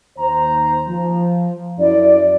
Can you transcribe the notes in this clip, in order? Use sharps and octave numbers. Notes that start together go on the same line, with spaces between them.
D#2 C5 A#5
F3
F#2 E4 D5